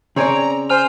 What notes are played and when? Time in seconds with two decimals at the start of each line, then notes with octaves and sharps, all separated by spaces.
0.16 C#3 C4 C#5 D5 G#5 A#5
0.69 C5 G#5 F6 F7